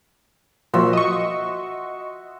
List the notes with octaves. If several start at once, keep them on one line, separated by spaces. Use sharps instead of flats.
A#2 F3 F#4 E5 C6
D#5 C#6